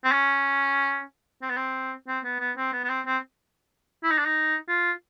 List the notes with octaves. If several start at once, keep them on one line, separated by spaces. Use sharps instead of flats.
C4
C#4
C4
B3
C4
C4
B3
B3
C4
B3
B3
C4
C4
E4
D#4
D4
D#4
F4